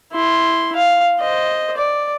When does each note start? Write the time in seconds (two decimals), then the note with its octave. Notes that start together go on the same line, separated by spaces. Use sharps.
0.12 E4 C6
0.76 F5
1.20 C5 D#5
1.77 D5